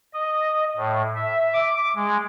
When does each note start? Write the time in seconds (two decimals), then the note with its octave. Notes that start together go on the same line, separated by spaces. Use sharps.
0.14 D#5
0.77 A2
1.15 E5
1.54 D6
1.95 G#3